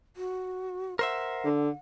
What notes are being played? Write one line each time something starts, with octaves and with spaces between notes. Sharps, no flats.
F#4
A#4 C5 E5 F#5
D3